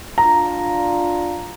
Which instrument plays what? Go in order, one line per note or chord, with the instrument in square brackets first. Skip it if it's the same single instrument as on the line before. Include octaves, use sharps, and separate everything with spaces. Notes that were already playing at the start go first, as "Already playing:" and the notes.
[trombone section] D4 F4 [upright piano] A#5